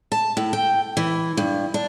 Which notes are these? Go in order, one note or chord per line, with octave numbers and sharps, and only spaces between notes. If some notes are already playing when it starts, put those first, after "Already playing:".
A5
A2
G5
E3
G2
D4